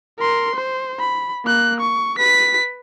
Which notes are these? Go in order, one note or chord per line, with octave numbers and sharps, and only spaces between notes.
A#4 C6
C5
B5
A#3 F#6
C#6
B4 B6